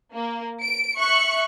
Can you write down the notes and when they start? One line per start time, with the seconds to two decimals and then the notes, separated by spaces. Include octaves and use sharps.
0.14 A#3
0.62 D7
0.99 E5 C#6 F#6 C#7